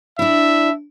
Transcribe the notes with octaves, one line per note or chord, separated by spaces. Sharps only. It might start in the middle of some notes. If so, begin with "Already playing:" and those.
D4 E4 E5